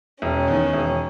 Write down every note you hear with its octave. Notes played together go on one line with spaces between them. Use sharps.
E1 C#4
E2 D#3
E1